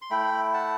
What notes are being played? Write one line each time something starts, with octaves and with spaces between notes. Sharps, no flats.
C6
A3 E4 G5 B5
F#5 A5